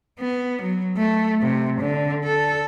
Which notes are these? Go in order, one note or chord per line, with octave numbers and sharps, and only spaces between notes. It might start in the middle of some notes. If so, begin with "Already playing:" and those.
B3
F#3
A3
C3
D3
A4